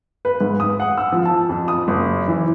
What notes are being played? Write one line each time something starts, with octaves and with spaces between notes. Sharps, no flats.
B4
G#2
D#6
F#5
E6
F3
A5
F2
D#6
F#1
E3